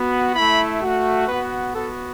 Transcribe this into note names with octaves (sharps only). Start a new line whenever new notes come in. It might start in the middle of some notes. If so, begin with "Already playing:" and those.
Already playing: B3 F#4
A3 E4 B5
A3 F#4
B3 F#4 B4
B3 F#4 A4